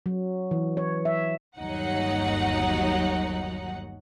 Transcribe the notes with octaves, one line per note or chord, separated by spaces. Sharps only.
F#3
E3
C#5
E5
G1 D#2 F#3 D#4 F#5